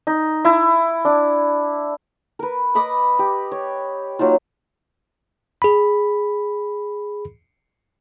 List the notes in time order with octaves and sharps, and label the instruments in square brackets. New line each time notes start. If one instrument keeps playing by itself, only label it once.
[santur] D#4
E4
D4
A#4 B4
D#5 B5 D6 D#6
G4
C#5
F#3 A#3 D#4 F4
[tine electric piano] G#4 B5